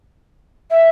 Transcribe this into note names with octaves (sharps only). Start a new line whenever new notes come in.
E5